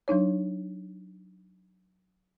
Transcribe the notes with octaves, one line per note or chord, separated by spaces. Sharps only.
F#3 D4 D#4 C#5